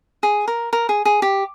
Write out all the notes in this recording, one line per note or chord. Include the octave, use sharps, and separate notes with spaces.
G#4
A#4
A#4
G#4
G#4
G4